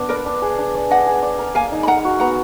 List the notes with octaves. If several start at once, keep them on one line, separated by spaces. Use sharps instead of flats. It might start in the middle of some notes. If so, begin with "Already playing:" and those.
Already playing: B3 D4
A#4 B4 D5
D4
G#4
D4
D5
D4 D#5 F#5
G#4
D5
A#4
A#3 F5 G#5
D#4
B5
A#4 F#5 A#5
F#4
B3 F#5 A#5